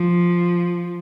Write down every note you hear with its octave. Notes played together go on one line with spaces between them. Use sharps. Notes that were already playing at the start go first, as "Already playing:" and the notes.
Already playing: F3